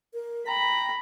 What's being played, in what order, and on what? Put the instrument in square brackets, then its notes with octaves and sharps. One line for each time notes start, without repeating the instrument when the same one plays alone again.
[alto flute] A#4
[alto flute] G5 [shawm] A#5 [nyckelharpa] B5